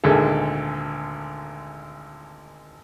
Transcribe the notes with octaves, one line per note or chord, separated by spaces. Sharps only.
G#1 D2 A#2 G#3 G#4 A4